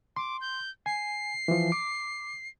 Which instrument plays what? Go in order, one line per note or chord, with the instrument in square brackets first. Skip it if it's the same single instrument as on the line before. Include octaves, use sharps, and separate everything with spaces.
[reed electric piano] C6 [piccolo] D6
[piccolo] G6
[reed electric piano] G#5 [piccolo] C7
[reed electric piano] E3 F3
D6